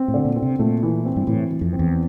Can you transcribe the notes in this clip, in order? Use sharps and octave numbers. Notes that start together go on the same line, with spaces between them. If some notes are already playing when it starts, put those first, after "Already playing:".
Already playing: C4
A2
D3
A#2
C4
C3
A#2 A3
E3
C4
G2
A2 E3
E3
F2
C4
E2